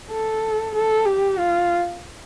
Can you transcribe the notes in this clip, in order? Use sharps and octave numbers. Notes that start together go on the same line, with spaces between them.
A4
A4
G4
F4